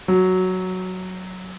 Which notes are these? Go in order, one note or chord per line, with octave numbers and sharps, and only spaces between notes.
F#3